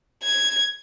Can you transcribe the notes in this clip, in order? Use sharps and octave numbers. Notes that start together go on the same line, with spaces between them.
G#6